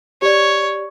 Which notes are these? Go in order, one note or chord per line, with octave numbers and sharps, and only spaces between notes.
G4 C#5 D5